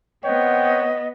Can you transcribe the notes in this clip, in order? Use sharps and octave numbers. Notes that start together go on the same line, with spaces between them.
B3 C4 C#5 D#5 F#5 G5